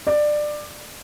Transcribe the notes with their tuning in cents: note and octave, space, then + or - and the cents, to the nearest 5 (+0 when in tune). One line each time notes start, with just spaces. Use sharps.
D5 +20